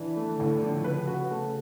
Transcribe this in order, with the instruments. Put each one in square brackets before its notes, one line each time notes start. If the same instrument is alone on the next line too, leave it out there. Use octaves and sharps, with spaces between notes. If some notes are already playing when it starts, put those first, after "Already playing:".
Already playing: [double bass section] E3 [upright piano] D4
[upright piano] A3
[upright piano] A2 [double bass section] D3
[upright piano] F3
[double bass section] C#3 [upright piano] B4
[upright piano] F#4
A3